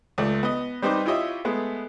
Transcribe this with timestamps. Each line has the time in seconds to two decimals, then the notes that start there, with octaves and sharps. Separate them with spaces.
0.18 C#2 A3 D5
0.43 B3 D#5
0.82 G3 C4 D#4 B4 C5 D6
1.05 E4 F4 G4 C#5 D#5 E5
1.45 G#3 A3 B3